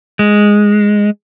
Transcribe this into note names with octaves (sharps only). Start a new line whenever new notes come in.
G#3